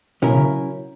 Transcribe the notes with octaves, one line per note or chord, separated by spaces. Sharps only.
B2 F#3 C#4 E4 A#4
C#3